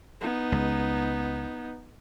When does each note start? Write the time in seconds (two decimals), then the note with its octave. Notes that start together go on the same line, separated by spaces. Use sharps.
0.21 B3 D#4
0.52 C#2